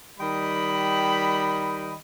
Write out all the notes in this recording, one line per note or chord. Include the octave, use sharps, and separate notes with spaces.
D#3 G3 D#5 G5 B5